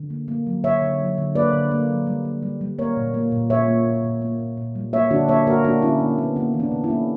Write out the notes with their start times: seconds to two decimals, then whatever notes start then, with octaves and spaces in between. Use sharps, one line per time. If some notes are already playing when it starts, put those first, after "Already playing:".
Already playing: D3
0.10 A#3
0.28 A#3
0.47 F#3
0.64 D3 C#5 E5
0.82 D3
1.00 F#3
1.18 D3
1.35 A#3 B4 D5
1.53 D3
1.71 A#3
1.89 F#3
2.07 G3
2.25 A#3
2.42 G3
2.61 G3
2.79 A#3 A#4 C#5
2.97 A#2
3.14 A#3
3.32 A#2
3.50 A#2 C#5 E5
3.68 A#3
3.86 A#2
4.04 A#2
4.22 A#3
4.39 A#2
4.57 A#2
4.75 G3
4.93 A#3 C#5 E5
5.10 D3 D4 F#4
5.29 A#3 C#5 E5
5.47 A#3 F#4 A#4
5.65 A#3 D4 F#4
5.82 D3 C#4 E4
6.00 A#3
6.18 A#3 B3
6.36 C#3 A#3 C#4
6.54 E3
6.60 B3 D4
6.72 C#3
6.84 C#4 E4
6.90 A#3